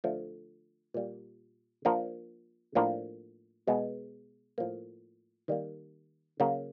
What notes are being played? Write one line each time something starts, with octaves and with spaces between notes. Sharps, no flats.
D3 F3 A3
A#2 G3 A#3
F3 A#3 D4
A2 F3 A#3 D4
B2 G#3 B3
A2 F3 A#3
D#3 G3 A#3
C#3 F#3 A#3